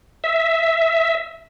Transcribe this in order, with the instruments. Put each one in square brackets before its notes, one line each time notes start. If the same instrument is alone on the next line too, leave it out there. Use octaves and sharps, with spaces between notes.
[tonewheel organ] E5